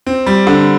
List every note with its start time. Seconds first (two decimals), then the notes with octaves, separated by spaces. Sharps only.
0.07 C4
0.27 G3
0.47 D3